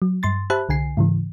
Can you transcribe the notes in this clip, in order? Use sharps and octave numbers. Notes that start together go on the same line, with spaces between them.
F#3
G2 C6 A6
G4 C5 E5 A5 B5 F#6
C2 D3 G#5 C7
G#2 C#3 E3